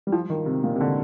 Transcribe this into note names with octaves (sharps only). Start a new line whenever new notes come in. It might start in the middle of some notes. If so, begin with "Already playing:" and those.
G3
F3
D#3
C3
A#2
C3
D3